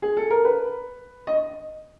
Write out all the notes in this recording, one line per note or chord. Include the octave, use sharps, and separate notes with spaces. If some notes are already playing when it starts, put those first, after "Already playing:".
G#4
A4
A#4
B4
D#5